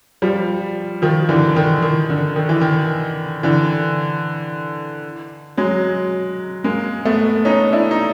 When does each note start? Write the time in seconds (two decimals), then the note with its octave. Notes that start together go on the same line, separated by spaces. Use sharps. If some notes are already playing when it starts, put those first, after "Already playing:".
0.22 F3 G3
1.02 D#3 F3
1.29 D3 E3
1.56 D#3
1.83 D#3
2.10 D3
2.36 D#3
2.49 E3
2.61 D#3
3.43 D3 E3
5.57 F#3 G#3
6.64 G#3 A#3
7.05 A3 B3
7.45 C#4 D#4
7.72 D4 E4
7.91 D#4